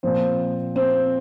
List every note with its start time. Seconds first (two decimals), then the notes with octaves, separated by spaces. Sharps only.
0.03 A#2 F3 C4
0.76 C4